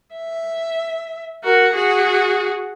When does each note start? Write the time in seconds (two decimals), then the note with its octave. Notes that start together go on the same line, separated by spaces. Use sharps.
0.15 E5
1.44 F#4 A#4
1.74 F#4 G#4